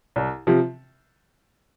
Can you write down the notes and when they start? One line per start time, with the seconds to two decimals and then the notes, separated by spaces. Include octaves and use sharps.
0.16 C2
0.47 C3 F3